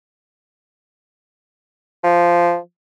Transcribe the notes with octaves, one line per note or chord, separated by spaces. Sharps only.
F3